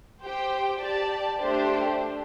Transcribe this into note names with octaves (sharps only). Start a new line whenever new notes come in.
G4 C5 G5
G4 D5 A5
A3 D4 G4 C5